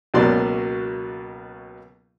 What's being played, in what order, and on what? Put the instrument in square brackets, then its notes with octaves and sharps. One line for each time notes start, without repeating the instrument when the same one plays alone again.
[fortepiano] C#2 B2 F#3 A#3 D5 C6